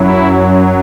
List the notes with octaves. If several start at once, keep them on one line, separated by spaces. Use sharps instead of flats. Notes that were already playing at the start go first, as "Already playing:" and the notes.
Already playing: F#2 F#3 E4